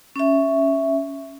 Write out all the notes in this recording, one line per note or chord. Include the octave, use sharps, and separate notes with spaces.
C#4 E5